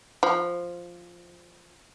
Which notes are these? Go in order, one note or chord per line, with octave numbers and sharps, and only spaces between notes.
F3